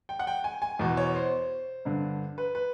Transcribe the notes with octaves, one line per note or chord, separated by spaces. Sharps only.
G5
F#5
G5
G#5
G#5
E2 B2
C#5
C5
G2 D3
B4
B4